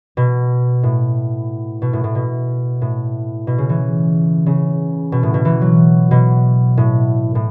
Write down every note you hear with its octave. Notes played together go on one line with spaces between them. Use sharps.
B2
A2
B2
A2
A2
B2
A2
B2
C#3
E3
C#3
B2
A2
B2
E3
F#3
B2
A2
A2